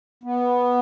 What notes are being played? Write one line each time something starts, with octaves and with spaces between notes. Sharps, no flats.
B3